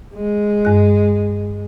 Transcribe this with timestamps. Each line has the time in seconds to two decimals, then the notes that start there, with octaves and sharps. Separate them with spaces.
0.14 G#3
0.65 G2 F#6